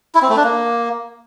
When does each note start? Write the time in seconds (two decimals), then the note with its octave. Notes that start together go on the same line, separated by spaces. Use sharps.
0.15 E4
0.22 C4
0.29 A3
0.36 D4
0.44 A#3